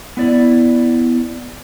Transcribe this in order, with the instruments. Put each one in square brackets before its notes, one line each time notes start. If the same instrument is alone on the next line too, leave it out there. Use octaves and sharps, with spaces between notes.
[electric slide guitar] B3 E4 D5